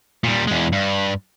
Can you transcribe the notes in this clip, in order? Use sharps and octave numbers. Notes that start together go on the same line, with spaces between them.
A#2 G3
E2 G#3
G2